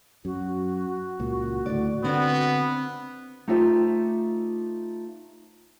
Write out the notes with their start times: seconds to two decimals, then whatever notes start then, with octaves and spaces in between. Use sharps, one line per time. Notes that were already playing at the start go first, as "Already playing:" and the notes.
0.25 F#2 F#4
1.20 C#2 A#2
1.66 D2 A2 D5
2.04 D3 B3 C4 D5
3.48 A3 D#4 F4 G4 C5 E5